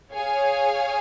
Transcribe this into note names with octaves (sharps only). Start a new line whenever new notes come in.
G#4 C#5 F5 G#5